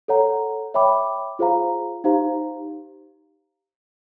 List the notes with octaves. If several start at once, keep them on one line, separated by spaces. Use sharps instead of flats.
A4 C#5 F#5 A#5
C#5 E5 G5 B5 D6
F4 G#4 C5 F5 A#5
D#4 G4 C5 F5 A#5